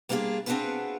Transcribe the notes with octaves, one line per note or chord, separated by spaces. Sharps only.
G3 A#3 B3 D4 F4 G#4
C4 D4 F4 F#4 G#4 B4